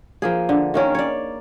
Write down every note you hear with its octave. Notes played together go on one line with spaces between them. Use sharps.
F3 A#3 G#4
D3
D#3 A#3 C#4 A#4
C#5 D5